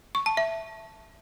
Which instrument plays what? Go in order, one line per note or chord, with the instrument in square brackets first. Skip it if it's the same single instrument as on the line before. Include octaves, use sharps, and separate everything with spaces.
[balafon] C#6
A5
E5